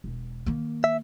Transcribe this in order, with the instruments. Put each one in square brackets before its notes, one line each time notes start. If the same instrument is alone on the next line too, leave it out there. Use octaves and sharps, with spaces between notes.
[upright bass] E1
D#3 A#3
[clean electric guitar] E5